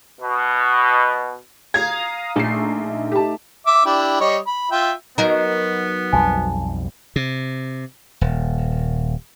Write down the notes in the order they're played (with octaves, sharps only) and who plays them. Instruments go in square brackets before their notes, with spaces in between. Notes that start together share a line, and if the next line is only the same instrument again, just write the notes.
[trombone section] B2
[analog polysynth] F5 A#5 D#6 [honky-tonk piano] G#6
[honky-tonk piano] A#1 C7 [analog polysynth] A3 D#4
[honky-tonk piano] G4 A5
[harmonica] E5 D6
D4 E4 G4
G3 C#5 D#5
B5
F4 E5 G5
[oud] F#3 D#4 A#4 [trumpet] B3
[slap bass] B1 F2 G3 [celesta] G#5 A5
[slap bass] C3
D#1